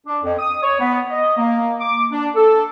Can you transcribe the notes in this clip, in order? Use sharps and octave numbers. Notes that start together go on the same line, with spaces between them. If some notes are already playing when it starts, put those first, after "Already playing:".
D4
F2
D#6
C#5
B3
D#5
A#3
D6
D4
A4